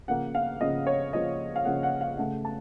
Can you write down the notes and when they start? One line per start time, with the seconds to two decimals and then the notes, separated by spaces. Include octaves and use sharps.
0.08 C#3 F3 A#3 F#5
0.35 F5
0.61 C#3 F3 A#3 D#5
0.87 C#5
1.13 C#3 F3 A#3 D#5
1.56 F5
1.65 C#3 F3 A#3 F#5
1.83 F#5
2.01 F5
2.18 C#3 A3 F#5
2.45 A5